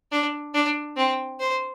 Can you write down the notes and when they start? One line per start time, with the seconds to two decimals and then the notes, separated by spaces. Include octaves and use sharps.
0.12 D4
0.54 D4
0.97 C4
1.40 C5